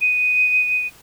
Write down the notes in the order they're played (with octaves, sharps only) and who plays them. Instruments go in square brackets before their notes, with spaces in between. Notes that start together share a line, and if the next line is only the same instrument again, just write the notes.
[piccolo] D#7